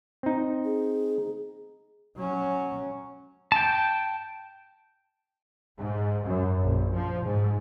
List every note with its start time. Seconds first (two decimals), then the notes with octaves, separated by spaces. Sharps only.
0.23 C4 D#4
0.65 G#4
2.17 F#3 C#4
3.52 G5 A5
5.80 G#2
6.27 F#2
6.61 A#1
6.95 F3
7.25 G#2